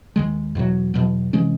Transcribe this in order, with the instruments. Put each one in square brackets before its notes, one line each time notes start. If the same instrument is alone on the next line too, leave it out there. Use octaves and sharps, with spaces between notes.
[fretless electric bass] D#2 D#3 G#3
E2 B2 F#3
E2 B2 F#3
C3 E3 G#3 C#4